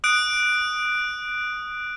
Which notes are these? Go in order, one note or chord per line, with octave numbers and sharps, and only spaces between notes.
D#6 F#6 D7